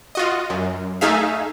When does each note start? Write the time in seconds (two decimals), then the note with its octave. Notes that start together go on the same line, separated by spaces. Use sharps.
0.15 F4 F#4 D#5
0.50 F#2
1.01 A3 D#4 G#4 E5 F5